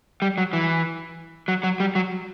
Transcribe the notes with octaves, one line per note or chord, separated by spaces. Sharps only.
G3
F#3
E3
F#3
F#3
G3
F#3